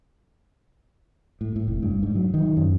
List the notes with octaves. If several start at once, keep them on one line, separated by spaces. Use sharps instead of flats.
A2
A2
F1
G2
G#2
F#3
D#3
F#2